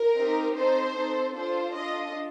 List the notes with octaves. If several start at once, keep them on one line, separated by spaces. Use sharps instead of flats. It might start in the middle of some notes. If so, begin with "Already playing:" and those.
Already playing: A#4
C4 D#4 G4
C4 D#4 A4 C5
C4 D#4 A4
D4 F4 A4 C5
D4 F4 A4 D#5